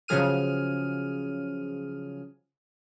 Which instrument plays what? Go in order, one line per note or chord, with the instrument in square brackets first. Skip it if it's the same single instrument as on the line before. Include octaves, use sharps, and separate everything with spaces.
[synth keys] C#3 F3 F#3 G#4 F6 D#7